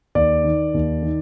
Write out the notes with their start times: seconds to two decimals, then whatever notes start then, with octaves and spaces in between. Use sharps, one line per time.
0.15 D#2 D5
0.44 D#3
0.74 D#2
1.03 D#3